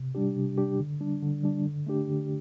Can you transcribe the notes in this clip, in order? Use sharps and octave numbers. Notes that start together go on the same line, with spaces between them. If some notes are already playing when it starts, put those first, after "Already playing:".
Already playing: C3
G3 D4 G4
C3
G3 D4 G4
D3
G3 D4
D3
G3 D4
D3
A3 D4 G4
D3